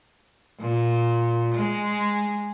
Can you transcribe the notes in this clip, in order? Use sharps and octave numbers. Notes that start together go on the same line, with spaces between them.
A#2
G#3